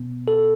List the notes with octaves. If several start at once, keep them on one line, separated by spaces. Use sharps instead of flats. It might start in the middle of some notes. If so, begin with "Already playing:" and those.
Already playing: B2 B3
A4